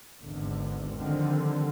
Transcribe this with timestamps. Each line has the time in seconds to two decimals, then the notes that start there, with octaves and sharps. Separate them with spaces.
0.22 G#1 E2 D3
0.95 D3 D#3 F3 G3 C4